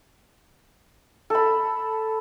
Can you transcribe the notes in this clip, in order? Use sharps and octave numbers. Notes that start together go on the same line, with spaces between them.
A4 B5